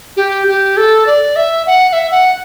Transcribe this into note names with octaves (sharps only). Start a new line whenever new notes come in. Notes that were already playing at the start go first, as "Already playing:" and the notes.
G4
G4
A4
D5
E5
F#5
F#5
E5
F#5